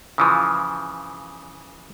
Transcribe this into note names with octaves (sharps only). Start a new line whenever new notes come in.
C#3 E3 F3